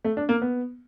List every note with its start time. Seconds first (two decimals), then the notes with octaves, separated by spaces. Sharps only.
0.05 A3
0.17 D4
0.29 A#3
0.42 B3